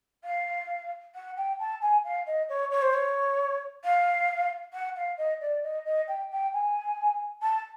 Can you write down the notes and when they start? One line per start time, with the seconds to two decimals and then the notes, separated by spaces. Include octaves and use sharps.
0.24 F5
1.15 F#5
1.37 G5
1.59 A5
1.81 G#5
2.04 F5
2.27 D#5
2.49 C#5
2.71 C#5
2.82 C5
2.94 C#5
3.84 F5
4.73 F#5
4.96 F5
5.18 D#5
5.41 D5
5.63 D#5
5.85 D#5
6.08 G5
6.31 G5
6.53 G#5
7.42 A5